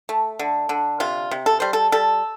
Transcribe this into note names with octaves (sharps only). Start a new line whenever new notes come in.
A3
D3
D3
C3 F4
C3
A4
G3 C5
A4
G3 A4